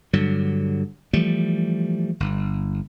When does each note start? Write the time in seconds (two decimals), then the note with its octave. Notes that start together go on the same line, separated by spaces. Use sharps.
0.13 G2 D3 F#3
1.13 E3 F3 G3 A3
2.20 G1